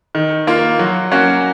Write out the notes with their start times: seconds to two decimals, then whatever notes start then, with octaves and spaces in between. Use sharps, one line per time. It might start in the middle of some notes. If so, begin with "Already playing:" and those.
0.15 D#3
0.47 A#3 F4
0.79 F#3
1.11 A#3 C#4 F#4